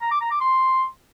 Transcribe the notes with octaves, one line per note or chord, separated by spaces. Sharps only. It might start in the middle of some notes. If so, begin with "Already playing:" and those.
A#5
D6
A#5
D6
C6